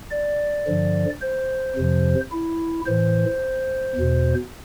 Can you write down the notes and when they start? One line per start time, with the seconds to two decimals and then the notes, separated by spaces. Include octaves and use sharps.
0.11 D5
0.67 G2 D3 F3
1.22 C5
1.76 F2 C3 F3
2.32 E4
2.86 A2 E3 C5
3.95 E2 B2